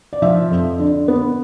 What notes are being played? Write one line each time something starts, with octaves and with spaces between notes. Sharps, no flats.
D5
F3 E5
F2
D3
B3